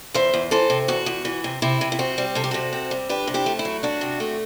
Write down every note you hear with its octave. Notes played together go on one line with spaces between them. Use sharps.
E2 C5 E5
E2
E3 A4 C5
C3
E2 F#4
E2
E3
C3
C3 E4
C3
E4
C4 F#4
G3
C3 A4
G4
C3 F#4 A4
C4
G3
D4 G4 B4
C3
E4 G4
A3
E4
F#3
D4 F#4
C3
A3